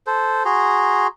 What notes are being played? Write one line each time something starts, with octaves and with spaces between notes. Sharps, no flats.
A4 C5
F#4 G#4 A#5 C6